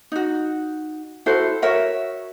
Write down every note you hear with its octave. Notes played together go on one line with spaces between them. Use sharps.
D#4 F#4
E4 F#4 A4 C5
F#4 A#4 C#5 E5